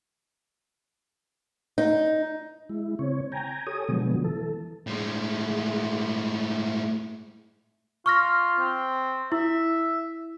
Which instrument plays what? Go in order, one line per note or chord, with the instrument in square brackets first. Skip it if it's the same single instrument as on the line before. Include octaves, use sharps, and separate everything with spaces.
[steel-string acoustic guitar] D#4
[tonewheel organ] G#3 E4
C#3 C4 C#5
G5 G#5 A#5
G4 A4 C#5 G#5 D#6
B2 D3 F3 F#3 G#3 B3
E3 A4
[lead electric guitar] A2 G#3
[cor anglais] F4 [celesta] C#6 F6 A#6
[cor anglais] C4
[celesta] E4 [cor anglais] E5